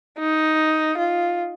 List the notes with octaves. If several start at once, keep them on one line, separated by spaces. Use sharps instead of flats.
D#4
F4